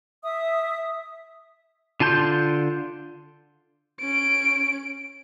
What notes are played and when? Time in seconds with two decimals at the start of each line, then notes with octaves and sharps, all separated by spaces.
0.23 E5 D#6
2.00 D3 F4 A5 C6 G6
4.00 C#4 D7